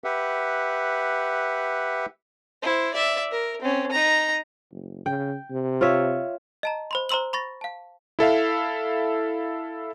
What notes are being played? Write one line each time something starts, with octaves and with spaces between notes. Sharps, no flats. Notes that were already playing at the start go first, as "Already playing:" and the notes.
G4 B4 E5 F#5
E4 C5
D5 E5
A#4
C4 C#4
D#4 A#5
F#1
C#3 G5
C3
F4 C#5 E5
D#5 A5 A#5
C5 B5 C6
C5 A#5 C6 E6 F#7
B5 C#6 A6 A#6
F5 A5
E4 A4 E5 F5